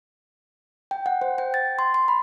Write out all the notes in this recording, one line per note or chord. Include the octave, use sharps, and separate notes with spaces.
G5
F#5
C5
G5
A6
C6
C6
B5